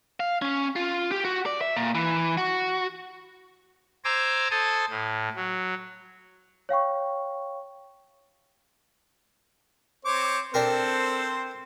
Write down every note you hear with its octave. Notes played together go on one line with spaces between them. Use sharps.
F5
C#4
F4
G4
F#4
D5
E5
A#2
E3
F#4
C5 G#5 A#5 D6 E6
A4 C5 G#5 A5 D#6
A2
F#3
C#5 F5 G5 C#6
C4 C5 C#5 D6
C4 D4 G4 A4 A#4 C5